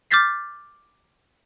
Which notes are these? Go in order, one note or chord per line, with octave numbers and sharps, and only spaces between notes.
D6 F6 G6 A6 B6 C7